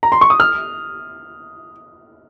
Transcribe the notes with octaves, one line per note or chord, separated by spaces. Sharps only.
A#5
C6
C#6
D#6
F6